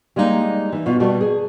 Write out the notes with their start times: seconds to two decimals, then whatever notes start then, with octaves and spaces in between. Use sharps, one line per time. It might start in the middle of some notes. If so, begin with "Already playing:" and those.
0.16 G3 G#3 A#3 D#4
0.72 E3
0.86 B2 B3 F4
1.00 B2 G3 A3 F#4
1.21 G#4